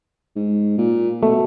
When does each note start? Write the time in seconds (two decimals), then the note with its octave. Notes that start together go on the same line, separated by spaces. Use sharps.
0.36 G#2
0.78 A#2
1.23 B2 A3